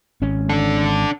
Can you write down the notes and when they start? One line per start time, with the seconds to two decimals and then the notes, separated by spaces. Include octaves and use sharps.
0.22 G#1 C#4
0.49 D4 A4